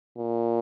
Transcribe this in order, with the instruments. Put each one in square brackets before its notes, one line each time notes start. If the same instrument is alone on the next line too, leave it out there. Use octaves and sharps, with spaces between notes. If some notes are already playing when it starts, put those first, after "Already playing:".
[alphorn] A#2